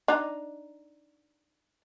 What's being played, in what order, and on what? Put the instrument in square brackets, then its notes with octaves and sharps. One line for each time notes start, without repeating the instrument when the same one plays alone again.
[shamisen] D4 D#4